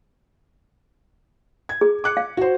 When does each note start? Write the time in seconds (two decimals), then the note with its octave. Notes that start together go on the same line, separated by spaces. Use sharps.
1.69 G#6
1.81 G#4
2.04 D6 F#6 C#7
2.17 F5
2.37 F#4 C5